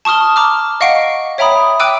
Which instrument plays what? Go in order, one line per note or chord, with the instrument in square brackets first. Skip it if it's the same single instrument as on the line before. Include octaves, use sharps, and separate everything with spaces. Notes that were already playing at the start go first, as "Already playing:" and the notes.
[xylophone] A5 C#6 D#6 F6 G7
A#5 D6 F6
D#5 F5 F#5 C#6 C7 D7
C#5 E5 G5 A#5 B5 D#6
G5 D6 E6 F#6 D#7